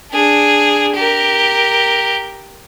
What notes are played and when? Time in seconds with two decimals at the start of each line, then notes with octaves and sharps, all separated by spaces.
0.12 D4 G#4
0.96 G4 A#4